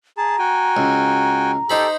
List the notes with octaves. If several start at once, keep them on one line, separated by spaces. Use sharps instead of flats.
G#4 A5 A#5
F#4 G5 G#5
C#2
D#4 G4 A4 C5 B5